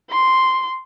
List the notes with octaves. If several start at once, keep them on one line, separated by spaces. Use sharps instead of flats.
C6